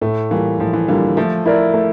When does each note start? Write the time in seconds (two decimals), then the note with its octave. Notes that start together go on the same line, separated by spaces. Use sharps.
0.01 A2 A3
0.30 E3 G3 A#3 F4
0.59 A2 F3
0.73 E3
0.88 D3 G3 A#3 F4
1.17 F3 A3
1.46 E4 A#4 D5
1.74 A3